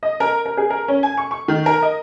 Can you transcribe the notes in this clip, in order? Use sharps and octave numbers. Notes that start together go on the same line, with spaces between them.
D#5
A#4
A#4
G#4
A#4
C#4
G#5
C#6
C#6
D#3
A#4
D#5